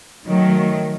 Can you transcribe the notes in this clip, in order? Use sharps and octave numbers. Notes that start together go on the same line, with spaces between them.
D#3 F#3 A3